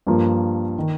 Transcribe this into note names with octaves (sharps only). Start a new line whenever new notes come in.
G2 F3 A#3
D#3